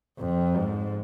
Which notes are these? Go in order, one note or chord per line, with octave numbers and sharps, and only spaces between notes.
F2
G#2